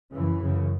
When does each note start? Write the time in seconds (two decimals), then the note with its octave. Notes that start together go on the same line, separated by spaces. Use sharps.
0.11 F#2 C#3 E3
0.40 F#2 C#3